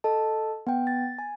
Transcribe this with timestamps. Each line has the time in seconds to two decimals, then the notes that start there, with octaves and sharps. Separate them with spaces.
0.04 A4 D#5 A5
0.67 B3 G5
0.87 A6
1.19 G#5